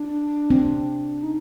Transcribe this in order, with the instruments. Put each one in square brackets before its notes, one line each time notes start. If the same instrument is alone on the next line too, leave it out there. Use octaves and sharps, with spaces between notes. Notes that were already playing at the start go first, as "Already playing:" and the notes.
Already playing: [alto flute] D4
[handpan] C4
[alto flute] D#4